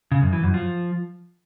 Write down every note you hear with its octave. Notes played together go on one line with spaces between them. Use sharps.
C#3
F#2
E3
F#2
F3